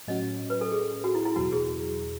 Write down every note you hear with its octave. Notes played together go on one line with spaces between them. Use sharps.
A2 F#3 C#4 F#4 D#5
B4
A4
G#4
F#4
E4
E4
E2 B2 F#3 F#4
G#4